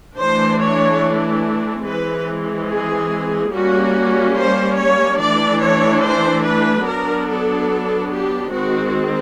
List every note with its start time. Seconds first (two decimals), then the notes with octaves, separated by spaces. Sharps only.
0.17 E3 A3 D4 C5
0.59 C#5
1.84 E3 G#3 C4 B4
2.68 G#4
3.52 G3 A#3 C#4 F#4
4.35 C5
4.77 C#5
5.18 E3 A3 D4 D5
5.60 C#5
6.02 C5
6.44 B4
6.85 F#3 B3 D4 A#4
7.27 A4
8.11 G4
8.52 D#3 G#3 C4 F#4